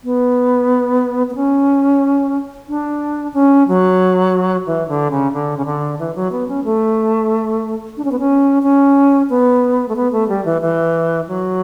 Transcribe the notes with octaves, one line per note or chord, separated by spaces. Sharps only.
B3
B3
C#4
D4
C#4
F#3
E3
D3
C#3
D3
C#3
D3
E3
F#3
B3
C#4
A3
D4
C#4
B3
C#4
C#4
B3
A3
B3
A3
G3
E3
E3
F#3